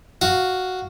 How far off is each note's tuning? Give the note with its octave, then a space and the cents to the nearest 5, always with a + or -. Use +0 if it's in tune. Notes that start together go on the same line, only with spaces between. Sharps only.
F#4 +0 F5 +0